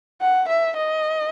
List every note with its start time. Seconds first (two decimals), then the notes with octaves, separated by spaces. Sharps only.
0.21 F#5
0.49 E5
0.77 D#5